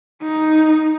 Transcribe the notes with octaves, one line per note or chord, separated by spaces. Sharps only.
D#4